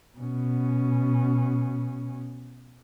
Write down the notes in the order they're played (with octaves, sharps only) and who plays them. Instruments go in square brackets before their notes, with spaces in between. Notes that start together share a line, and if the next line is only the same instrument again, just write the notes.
[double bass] B2 C#4